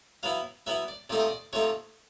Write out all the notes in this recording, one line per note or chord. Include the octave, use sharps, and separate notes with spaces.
F#3 B3 E4 F5
F#3 B3 E4 E5
D5
C3 F3 A3 C4 D#4 D5
D#5
D5
C3 F3 A3 C4 D#4 C#5